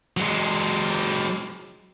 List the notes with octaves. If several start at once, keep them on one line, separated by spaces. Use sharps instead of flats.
F#3 G#3